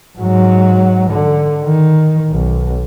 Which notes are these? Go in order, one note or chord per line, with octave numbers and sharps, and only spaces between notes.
G#2 F#3
D3
D#3
B1